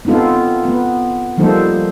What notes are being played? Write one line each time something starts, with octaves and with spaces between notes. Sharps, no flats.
B3 C4 D#4 F4 A4
B3
F3 G3 A#3 D#4 A4 C5